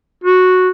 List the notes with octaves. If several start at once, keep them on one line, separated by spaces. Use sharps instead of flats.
F#4